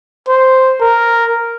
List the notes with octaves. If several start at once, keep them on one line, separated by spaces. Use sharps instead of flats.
C5
A#4